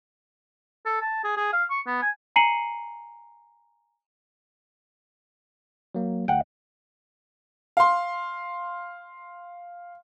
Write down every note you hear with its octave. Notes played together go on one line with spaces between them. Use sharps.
A4
A5
G#4
G#4
F5
C#6
B3
G#5
G#5 A#5 C7 C#7 D#7 F#7
F#3 A#3
D2 F#5 G5
F5 C6